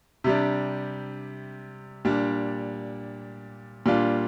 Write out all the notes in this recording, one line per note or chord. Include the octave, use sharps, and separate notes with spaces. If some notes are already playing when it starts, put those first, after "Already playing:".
C3 G3 D4
A#2 G3 D4
A#2 G3 D4 F4